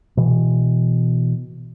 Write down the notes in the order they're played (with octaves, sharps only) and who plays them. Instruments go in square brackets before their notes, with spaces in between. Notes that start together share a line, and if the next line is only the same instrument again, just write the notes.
[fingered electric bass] B2 E3